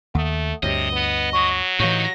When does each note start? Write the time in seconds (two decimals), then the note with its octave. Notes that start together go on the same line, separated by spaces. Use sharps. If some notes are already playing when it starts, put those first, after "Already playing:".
0.15 D#2 A3 F#5 D#6
0.63 D2 G2 C3 C#5 D#5
0.92 B3
1.33 F#3 C#6 D#6
1.80 A2 E3 D#4 G4 C#5 F5